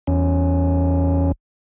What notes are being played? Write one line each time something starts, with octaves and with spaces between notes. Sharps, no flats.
E2 C#4